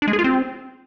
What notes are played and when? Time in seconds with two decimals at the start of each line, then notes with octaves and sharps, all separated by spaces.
0.02 D4
0.08 G#3
0.13 G#4
0.19 F4
0.24 C4